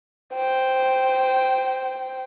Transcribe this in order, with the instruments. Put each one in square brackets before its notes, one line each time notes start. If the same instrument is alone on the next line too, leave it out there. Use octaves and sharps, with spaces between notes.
[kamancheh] C5 G5